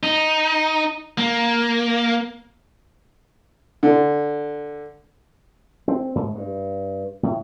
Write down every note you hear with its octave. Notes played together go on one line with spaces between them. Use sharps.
D#4
A#3
D3
C4
G#2
G2
A2